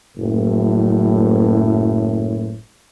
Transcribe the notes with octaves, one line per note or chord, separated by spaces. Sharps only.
F#1 A2